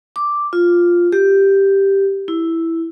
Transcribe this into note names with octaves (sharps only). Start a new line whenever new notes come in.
D6
F4
G4
E4